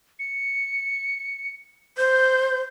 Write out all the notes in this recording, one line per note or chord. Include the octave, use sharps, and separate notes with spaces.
C#7
C5 G6